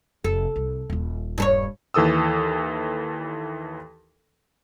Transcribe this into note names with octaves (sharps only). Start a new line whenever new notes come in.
F1 A4
C2
D#1 F4
G2 A4 C#5
D#2 E3 A4 D#6 E6